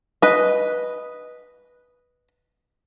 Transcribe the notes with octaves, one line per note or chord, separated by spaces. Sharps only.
B4 D#5